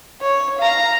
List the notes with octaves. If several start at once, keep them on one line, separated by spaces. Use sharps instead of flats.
C#5
F5 A#5